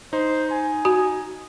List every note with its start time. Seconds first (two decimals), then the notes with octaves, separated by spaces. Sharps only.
0.13 D#4 C5
0.51 G#5
0.85 F#4